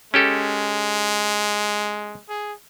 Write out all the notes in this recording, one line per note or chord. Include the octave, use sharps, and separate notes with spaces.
G#3 C#4 G4 A4
G#4